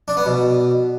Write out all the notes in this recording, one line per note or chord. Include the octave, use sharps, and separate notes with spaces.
D4
B3
B2